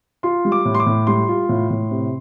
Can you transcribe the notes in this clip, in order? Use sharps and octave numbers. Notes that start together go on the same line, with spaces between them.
F4 C6
G3
D6
A2
C6
D6
A2
G3 C6
F4
A2
A2
C3